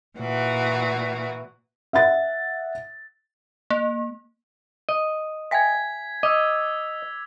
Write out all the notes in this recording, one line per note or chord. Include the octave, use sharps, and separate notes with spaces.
A#2 E3 F#4
E5 F#5 A6
A#3
D#5
E5 G5 G#5 G#6 B6
D#5 D6 E6